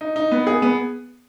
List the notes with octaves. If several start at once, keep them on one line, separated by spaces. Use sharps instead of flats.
D#4
D#4
B3
G#4
B3